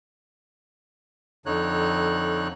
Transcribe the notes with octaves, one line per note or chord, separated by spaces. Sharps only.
F2 D3 D#4 C#5 F#6